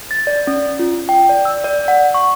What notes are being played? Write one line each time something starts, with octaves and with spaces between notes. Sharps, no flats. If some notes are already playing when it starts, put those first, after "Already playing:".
A6
D5
C#4
F4
G5
D5
E6
D5
F#5
C#6